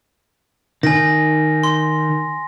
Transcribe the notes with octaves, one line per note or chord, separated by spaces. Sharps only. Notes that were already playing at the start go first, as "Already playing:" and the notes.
D#3 G#5 A#6
C6